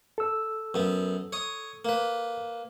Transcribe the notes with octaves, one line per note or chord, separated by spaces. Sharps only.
A4 E6
F#2 B3
C#5 D#6
A#3 B4